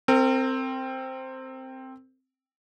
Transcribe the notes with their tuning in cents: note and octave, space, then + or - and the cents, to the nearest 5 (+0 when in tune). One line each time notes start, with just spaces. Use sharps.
C4 +0 A#4 -40